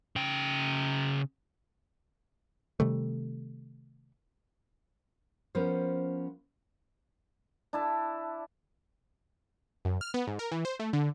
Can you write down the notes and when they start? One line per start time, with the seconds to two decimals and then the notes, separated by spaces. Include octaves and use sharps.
0.16 C#3 G5
2.80 C3 D#3 G3 A3
5.55 F3 B3 C#4 A#4 C5
7.73 D4 E4 A5
9.85 F#2
10.01 F6
10.14 B3
10.27 G#2
10.39 A#4
10.52 E3
10.65 C5
10.80 A3
10.93 D3